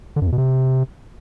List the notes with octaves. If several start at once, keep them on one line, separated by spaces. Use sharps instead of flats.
D3
F#2
E2
B2
C3